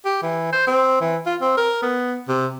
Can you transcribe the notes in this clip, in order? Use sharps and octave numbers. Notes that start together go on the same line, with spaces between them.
G4
E3
C5
C4
E3
F4
C4
A#4
B3
C3